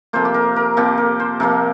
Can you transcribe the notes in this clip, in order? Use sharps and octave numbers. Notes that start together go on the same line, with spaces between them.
C3 F3 A#3 C5
G4
A#4
A#4
C3 F3 A#3 G4
A#4
C5
C3 F3 A#3 A#4